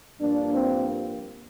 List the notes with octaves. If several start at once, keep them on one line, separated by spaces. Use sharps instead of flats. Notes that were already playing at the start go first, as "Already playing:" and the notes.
G2 F3 A#3 D4
C4